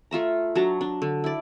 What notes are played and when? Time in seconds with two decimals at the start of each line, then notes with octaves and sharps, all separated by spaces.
0.11 A3 F4 E5 A#5
0.55 F#3 D4 A5 A#5
0.81 D4
1.02 D3
1.24 E4 D5